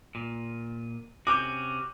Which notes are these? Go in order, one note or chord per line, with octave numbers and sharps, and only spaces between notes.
A#2
C3 C#4 F#4 D6 G6